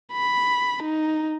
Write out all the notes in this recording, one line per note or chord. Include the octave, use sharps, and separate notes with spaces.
B5
D#4